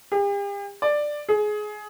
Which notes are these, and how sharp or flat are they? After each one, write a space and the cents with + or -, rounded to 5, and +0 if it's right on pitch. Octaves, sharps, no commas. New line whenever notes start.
G4 +45
D5 +10
G#4 +20